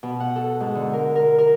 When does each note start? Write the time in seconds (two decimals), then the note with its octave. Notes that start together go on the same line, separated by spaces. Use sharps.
0.03 B2
0.20 F#5
0.36 A4
0.60 G#2
0.75 D3
0.93 A#4
1.16 A#4
1.39 A#4